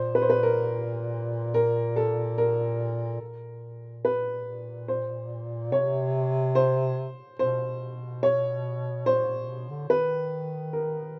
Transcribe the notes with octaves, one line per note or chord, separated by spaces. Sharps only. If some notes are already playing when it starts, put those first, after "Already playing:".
Already playing: A#2 C5
B4
C5
B4
A#4
A#4
A4
A#4
A#2
B4
C5
C3 C#5
C5
B2 C5
C#5
A#2 C5
A#2
B2
D3
D#3 B4
A#4